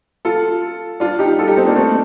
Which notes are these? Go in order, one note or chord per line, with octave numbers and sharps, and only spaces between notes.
F4 A4
D4 F4
D#4 G4
F4 A4
D#4 G4
C4 D#4
A#3 D4
A3 C4